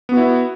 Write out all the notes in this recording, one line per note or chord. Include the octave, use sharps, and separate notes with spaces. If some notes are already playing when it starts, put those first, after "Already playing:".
B3 E4 F#4